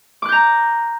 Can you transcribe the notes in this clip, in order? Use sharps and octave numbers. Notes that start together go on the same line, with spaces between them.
A#5 D6 F#6 G6